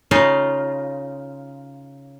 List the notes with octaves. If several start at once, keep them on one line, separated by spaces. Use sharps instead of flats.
C#3 D#4 F4